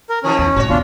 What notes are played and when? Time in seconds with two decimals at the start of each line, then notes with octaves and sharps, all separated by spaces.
0.10 A#4
0.24 B2 D#3 F3 C#4
0.38 E2
0.56 A2 C3 F#4 C#5
0.69 B1 F#2 D4 F4